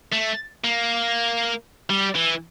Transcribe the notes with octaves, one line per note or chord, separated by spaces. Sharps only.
A3
A#3
G3
E3